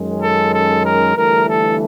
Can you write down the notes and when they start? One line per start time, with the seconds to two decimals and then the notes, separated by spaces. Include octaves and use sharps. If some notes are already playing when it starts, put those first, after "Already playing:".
Already playing: F#2 D#3 G#3 C#4
0.21 A4
0.53 A4
0.84 A#4
1.16 G1 G2 E3 A3 A#4
1.48 A4